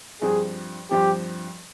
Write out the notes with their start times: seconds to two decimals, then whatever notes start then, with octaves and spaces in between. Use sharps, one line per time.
0.22 G2 F3 C4 G#4
0.91 G2 F3 C4 G4